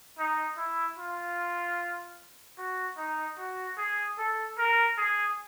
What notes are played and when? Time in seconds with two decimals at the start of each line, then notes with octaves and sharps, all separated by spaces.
0.18 D#4
0.57 E4
0.98 F4
2.58 F#4
2.98 D#4
3.38 F#4
3.78 G#4
4.18 A4
4.58 A#4
4.98 G#4